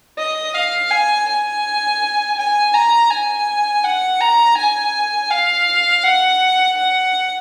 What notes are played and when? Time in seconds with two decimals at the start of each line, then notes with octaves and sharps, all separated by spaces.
0.19 D#5
0.55 F5
0.91 G#5
1.28 G#5
2.38 G#5
2.74 A#5
3.11 G#5
3.84 F#5
4.21 A#5
4.57 G#5
5.31 F5
6.04 F#5
6.77 F#5